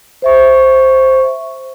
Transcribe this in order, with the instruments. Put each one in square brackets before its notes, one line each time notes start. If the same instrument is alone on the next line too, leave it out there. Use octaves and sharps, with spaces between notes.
[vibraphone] C5 E5 C#6